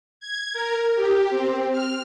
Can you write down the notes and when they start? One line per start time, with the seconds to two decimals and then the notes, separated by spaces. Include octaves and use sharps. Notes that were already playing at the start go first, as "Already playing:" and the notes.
0.20 G#6
0.53 A#4
0.95 G4
1.30 C4
1.72 F6